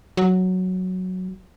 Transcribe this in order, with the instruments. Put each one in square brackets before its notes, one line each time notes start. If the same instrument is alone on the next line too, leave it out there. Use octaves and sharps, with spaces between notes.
[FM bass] F#3